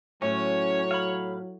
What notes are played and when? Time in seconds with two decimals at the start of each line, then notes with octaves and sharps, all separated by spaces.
0.22 A2 F#3 C#4 C#5
0.91 F5 B5